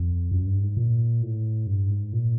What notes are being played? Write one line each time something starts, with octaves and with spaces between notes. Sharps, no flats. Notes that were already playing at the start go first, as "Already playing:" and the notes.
Already playing: F2
F#2
G2
G#2
A#2
A2
G2
G#2
A#2